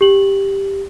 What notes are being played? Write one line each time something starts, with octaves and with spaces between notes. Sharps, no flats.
G4 F#7